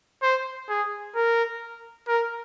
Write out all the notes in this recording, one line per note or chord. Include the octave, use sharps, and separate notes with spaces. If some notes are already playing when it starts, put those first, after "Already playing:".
C5
G#4
A#4
A#4